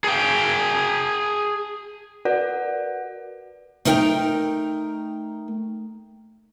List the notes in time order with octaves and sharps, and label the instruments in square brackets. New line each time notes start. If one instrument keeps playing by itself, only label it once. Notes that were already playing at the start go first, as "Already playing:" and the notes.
[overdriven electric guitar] G#4 G5
[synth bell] F#4 A#4 B4 D5 F#5
[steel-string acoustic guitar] A3 D#4 A#4 F#5 G5 A#5